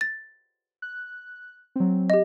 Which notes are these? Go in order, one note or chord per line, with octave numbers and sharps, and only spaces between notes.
A6
F#6
F#3 C4
G4 D#5